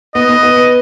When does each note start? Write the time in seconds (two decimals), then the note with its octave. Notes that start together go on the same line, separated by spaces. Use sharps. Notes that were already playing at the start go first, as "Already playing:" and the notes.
0.15 B3 D#5
0.29 B3
0.43 B3